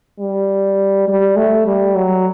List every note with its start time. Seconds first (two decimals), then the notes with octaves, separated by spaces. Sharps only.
0.19 G3
1.08 G3
1.36 A3
1.66 G3
1.95 F#3